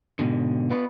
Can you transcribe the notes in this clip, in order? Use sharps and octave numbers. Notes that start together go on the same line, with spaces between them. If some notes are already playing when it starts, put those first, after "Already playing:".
G#2 B2 D3
B3 F4 B4